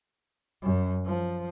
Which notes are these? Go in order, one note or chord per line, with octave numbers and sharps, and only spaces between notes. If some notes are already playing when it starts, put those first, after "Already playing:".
F#2
F3